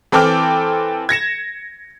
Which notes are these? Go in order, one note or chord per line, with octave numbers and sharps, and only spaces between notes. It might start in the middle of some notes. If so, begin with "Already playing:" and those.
E3 C4 A4 G5 D6 F6
G#6 A#6 C#7 E7